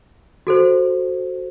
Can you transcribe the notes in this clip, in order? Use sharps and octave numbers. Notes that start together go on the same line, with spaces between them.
F#4 A4 C5